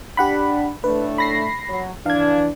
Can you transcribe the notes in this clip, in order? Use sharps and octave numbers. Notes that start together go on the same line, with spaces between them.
D4 G4 F#5 B5
A2 A3 D4 B4
B5 A#6 C7
F#3
E3 D4 F5 G#6